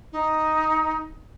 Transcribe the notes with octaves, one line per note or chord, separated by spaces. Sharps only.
D#4